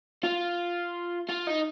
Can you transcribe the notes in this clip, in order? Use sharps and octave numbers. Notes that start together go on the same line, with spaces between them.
F4
F4
D#4